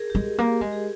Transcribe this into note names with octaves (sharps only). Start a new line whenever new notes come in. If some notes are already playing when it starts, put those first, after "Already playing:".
Already playing: G#4 A#4
G4
G#3 G#4
A#3 G4
G#3
G#4